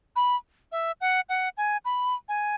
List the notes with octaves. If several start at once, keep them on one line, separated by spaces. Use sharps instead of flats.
B5
E5
F#5
F#5
G#5
B5
G#5